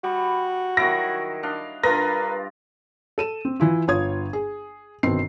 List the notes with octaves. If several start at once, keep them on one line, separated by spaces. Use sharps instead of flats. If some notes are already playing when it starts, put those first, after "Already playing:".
G3 F#4
D#3 F#3 E4 A#6
D4 D#5 F5
G2 D4 F4 A#4 B4 A#6
A4 D#7 E7
C4
E3 E4 F4
G1 F4 C#5 D#6 G#6
G#4
G1 B2 D#3 C4 C7